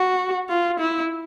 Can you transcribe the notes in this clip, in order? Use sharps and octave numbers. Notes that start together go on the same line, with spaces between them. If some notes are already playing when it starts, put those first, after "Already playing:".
Already playing: F#4
F4
E4